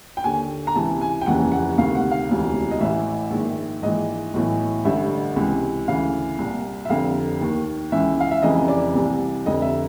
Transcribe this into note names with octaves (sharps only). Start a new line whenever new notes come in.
G5
D#2 D3 G#5
A#5
C#2 C3 E3 A5
G#5
G5
F1 D#2 C#3 E3 F#5
F#5
D2 C3 D#3 F5
F#5
F5
E1 D2 C3 E3
D#5
A1 A2 E3 E5
A#1 G#2 D#3
A#1 G#2 E3 D#5
B1 A2 E3
A1 G2 D3 E5
C#2 C3 E3
D2 C#3 E3 F5
C2 A#2
E5
F1 F2 D3 F5
D#2 D#3
C#2 C#3 E3 E5
F5
E5
F1 F2 C#3 E3 D#5
D5
C2 C3 E3
F1 F2 D3 D#5
E5